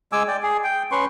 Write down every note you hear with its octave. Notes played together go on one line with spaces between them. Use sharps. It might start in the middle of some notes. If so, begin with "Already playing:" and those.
G#3 G#5 D6 E6
D5 G5
G#4
G5
C#4 B4 C6 C#6